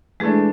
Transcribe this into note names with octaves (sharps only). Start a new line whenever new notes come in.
E3 G#3 A3 D4 G#4